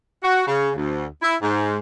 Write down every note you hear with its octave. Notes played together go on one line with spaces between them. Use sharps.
F#4
C#3
D2
E4
G#2